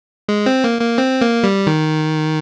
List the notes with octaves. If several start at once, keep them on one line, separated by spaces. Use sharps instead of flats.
G#3
C4
A#3
A#3
C4
A#3
G3
D#3